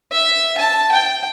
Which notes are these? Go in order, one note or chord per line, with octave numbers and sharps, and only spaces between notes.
E5
A5
G5